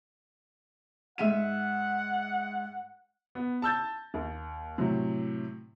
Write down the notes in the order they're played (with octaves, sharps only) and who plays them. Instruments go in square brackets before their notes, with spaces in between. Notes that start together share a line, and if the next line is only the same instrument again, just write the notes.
[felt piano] G#2 E5 D#7 [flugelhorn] F#5
[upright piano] B3
A5 E6 G6 A6
D#2
A2 C3 F#3